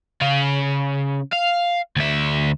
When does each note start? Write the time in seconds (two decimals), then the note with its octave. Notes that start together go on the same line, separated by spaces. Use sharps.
0.21 C#3 F5
1.33 F5
1.96 D2 E5